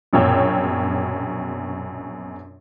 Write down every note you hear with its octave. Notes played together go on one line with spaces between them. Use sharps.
A#1 F#2 B2 C#5 G5 E6